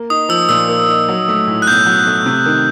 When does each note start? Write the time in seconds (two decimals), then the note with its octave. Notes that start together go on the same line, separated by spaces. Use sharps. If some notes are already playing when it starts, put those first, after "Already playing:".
Already playing: A#3
0.10 D#4 D#6
0.29 F3 E6
0.49 A#2 E6
0.68 A#3
0.88 D#4
1.08 F#3
1.28 A3
1.47 A2
1.62 F#6
1.67 B1 G6
1.86 F#3
2.07 A3
2.26 C3
2.46 D#3